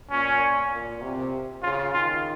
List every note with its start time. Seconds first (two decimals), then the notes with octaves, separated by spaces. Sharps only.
0.11 A#2 C#4
0.72 A#2
1.02 C3
1.62 C#3 F4
1.93 D#3 F4